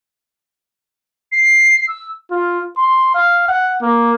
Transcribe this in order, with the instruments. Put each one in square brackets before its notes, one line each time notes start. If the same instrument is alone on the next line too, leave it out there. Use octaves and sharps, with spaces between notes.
[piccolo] C7
E6
[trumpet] F4
C6
F5
F#5
A#3